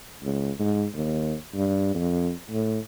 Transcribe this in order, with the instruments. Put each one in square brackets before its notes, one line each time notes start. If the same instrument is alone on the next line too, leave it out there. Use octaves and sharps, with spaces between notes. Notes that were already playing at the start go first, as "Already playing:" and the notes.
[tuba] C#2
G#2
D#2
G2
F2
A2